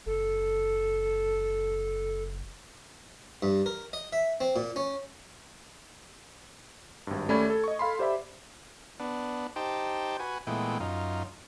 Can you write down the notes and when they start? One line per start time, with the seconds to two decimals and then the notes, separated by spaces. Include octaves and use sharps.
0.06 F#1 A4
3.43 G2
3.66 A#4
3.93 D#5
4.13 E5
4.41 C4
4.56 A#2
4.76 C#4
7.07 G#1 G2
7.29 D#2 A3 C#4 D5 B5 G#6
7.50 A4
7.64 D#5 C#6
7.79 A4 F5 B5 C6
7.99 G4 C5 D5 E5 B5
9.00 B3 D4
9.56 D#4 G4 C5 G5 A5
10.19 F#4 B4 G#5
10.47 A#2 E3 G#3 A3 B3 G5
10.80 F#2 D#4 F4